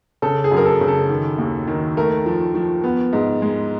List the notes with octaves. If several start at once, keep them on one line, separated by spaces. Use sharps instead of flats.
C#3 A4
G#4
F#2
A#4
A4
C#3
A4
D#3
D#2
D#3
A3 A#4
F3
F3
B3
G#2
G#3